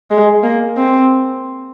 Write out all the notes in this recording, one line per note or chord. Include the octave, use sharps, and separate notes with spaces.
G#3
A#3
C4